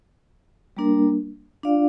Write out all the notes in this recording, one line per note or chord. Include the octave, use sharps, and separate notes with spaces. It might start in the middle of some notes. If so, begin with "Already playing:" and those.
G3 A#3 D4 A#4
D4 F4 D5 F5